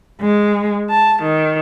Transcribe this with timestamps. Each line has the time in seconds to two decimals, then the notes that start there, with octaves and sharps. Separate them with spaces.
0.21 G#3
0.90 A5
1.21 D#3